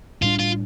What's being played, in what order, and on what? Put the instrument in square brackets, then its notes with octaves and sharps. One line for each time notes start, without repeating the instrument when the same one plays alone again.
[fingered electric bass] A2 G3 D4 [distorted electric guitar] F4
[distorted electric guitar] F4